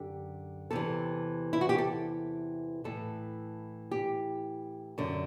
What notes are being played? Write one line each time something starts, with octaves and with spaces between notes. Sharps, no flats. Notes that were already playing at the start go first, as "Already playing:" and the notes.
Already playing: F#2 D3 G4
E2 C3 E3 A4
E4
F#4
G4
A4
A2 E3 A4
G4
F#2 D3